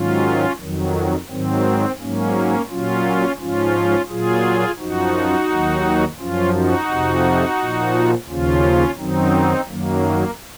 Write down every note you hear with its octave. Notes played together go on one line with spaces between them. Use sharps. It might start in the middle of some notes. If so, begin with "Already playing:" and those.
Already playing: G#2 D#3 F#3 C#4 F4
F2 D#3 F#3
G#2 D#3 F#3 C4
G#2 F#3 A#3 C#4
A#2 F#3 C#4 F4
G#2 F3 C#4 F4
A#2 F#3 F4 G#4
F#2 F3 D#4 F#4
D#2 D#3 F#3
F#2 F3 C#4 F4
D#4 F#4
F2 C3 F3
A#2 F3
D#2 C#3 F3 C#4 F4
F#2 D#3 F#3 C4 D#4
F#2 D#3 F#3 A#3